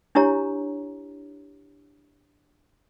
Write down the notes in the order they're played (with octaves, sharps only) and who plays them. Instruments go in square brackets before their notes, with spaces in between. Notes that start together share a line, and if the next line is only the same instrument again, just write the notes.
[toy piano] D4 E4 G4 C#5 A#5